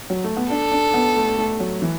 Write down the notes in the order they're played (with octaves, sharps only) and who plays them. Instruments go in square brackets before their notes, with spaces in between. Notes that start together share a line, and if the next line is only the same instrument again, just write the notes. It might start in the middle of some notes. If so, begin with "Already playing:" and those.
[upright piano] F#3
A3
B3
[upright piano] D4 [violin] A4
[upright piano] D4
B3
A3
A3
F#3
E3